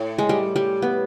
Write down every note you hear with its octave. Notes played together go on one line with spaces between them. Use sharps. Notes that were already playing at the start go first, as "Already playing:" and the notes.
Already playing: A2
G#3
G3
G3
B3